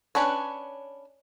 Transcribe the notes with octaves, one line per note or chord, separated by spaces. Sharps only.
C#4 D4 B4 C#5